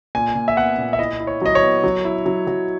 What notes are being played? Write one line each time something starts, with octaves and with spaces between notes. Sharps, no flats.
A#2 G#5
A#2
E5
B3 F#5
A#2
E5
E4 D#5
E4
C#5
F#3 D#5
C#5
B3
F#3
E4
F#3
F#3